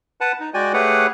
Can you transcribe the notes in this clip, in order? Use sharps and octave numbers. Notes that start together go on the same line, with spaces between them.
B4 F#5 A5
D#4
G#3 F#4 D5 G5 G#5
A3 G4 G#4 B4 C#5 F#5